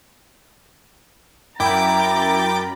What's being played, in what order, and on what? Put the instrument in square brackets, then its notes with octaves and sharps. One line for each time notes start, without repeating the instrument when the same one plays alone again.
[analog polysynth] F#2 A#4 B5 [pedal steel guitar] E4 [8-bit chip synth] G5 D6 [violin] A#5 A6